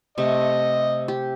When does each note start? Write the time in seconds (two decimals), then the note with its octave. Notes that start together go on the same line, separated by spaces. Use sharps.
0.18 C3 A3 D#5
1.08 G4